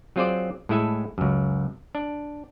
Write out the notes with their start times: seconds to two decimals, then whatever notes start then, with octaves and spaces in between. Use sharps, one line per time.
0.16 F#3 C4 F4 G#4 C5 D5
0.69 A2 G#3 E4 A4 G#5
1.18 C#2 F#2
1.95 D4